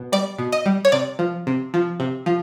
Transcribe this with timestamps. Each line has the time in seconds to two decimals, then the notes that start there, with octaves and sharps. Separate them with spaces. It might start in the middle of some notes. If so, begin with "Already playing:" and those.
Already playing: B2
0.12 G3 D5
0.39 B2
0.52 D#5
0.66 G3
0.85 C#5
0.92 C3 D5
1.19 F3
1.47 C3
1.74 F3
2.00 C3
2.26 F3